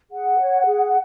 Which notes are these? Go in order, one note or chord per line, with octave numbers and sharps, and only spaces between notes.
G#4 F#5
C#5
G#4